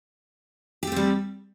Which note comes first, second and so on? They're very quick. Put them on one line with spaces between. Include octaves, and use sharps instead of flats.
G4 A3 C4 G3